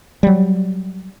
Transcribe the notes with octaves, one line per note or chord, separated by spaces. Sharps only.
F#3 G3